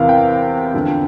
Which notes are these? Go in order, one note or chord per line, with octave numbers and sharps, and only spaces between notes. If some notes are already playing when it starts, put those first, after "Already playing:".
Already playing: E2 C3 E3 A#4 F5
G5
E2 D3 F3